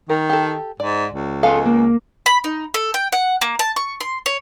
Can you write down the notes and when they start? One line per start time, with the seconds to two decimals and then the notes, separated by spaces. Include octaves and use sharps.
0.09 D#3 A#4
0.30 G4 A4
0.80 G#2 D5
1.14 C#2
1.43 G#3 B3 A4 D#5 F5
1.65 A#3
2.26 B5
2.44 D#4
2.74 A4
2.94 G5
3.12 F#5
3.41 A#3
3.59 A5
3.76 C#6
4.01 C6
4.26 C#5